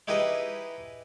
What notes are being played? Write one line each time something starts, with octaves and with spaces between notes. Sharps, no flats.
D#4 E4 G4 G#4 B4 D#5